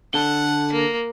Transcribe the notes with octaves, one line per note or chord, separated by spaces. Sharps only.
D3 A4 F#5
A#3